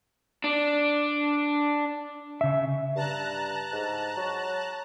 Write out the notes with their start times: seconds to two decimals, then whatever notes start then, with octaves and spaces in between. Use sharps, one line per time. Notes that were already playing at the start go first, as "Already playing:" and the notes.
0.44 D4
2.41 C#3 E5
2.96 G2 A5 A#5 F#6
3.72 G#2
4.17 F#3